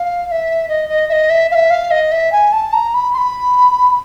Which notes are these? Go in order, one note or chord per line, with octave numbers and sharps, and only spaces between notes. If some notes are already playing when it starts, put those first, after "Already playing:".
Already playing: F5
F5
E5
D#5
D#5
E5
D#5
E5
F5
E5
F5
D#5
E5
G#5
A5
A#5
B5
C6
B5